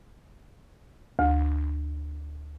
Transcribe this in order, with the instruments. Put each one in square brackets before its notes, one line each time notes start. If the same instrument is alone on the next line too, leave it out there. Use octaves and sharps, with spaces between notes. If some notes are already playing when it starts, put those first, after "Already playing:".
[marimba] D2